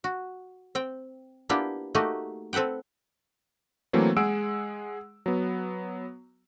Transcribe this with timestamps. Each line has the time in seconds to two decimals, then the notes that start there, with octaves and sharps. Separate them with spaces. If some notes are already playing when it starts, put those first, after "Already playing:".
0.04 F#4
0.75 C4 G5
1.49 A#3 B3 D4 E4 F4 G4
1.95 A3 A#3 D#4 F#4 G4 D#5
2.53 C4 A4 B4 F#5 G5
3.93 E3 F#3 A3 A#3 C4
4.17 G#3 G#4 F#5 E6 D7
5.26 F#3 B3